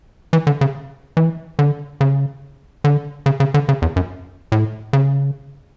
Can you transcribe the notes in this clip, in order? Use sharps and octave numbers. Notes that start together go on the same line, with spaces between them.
E3
D3
C#3
E3
D3
C#3
D3
C#3
C#3
D3
C#3
E2
F#2
A2
C#3